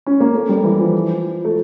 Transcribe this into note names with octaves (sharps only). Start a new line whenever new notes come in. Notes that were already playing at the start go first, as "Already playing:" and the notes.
C#4
A#3
A3
G3
E3
F3
A3